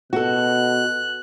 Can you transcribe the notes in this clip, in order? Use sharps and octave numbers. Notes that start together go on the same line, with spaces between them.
B2 F#4 A4 F#6